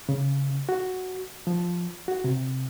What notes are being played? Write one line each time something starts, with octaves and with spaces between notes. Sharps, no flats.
C#3
F#4
F3
F#4
C3